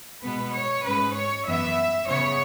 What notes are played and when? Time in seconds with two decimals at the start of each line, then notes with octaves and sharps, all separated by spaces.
0.22 B2 G#3 B3 B4
0.53 C#5
0.84 G#2 G#3 C#4 B4
1.15 C#5
1.45 F#2 E3 B3 E5
2.07 C#3 E3 B3 C#5